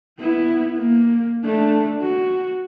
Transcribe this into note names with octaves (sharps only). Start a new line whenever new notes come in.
B3 E4
A#3
A3 D4
F#4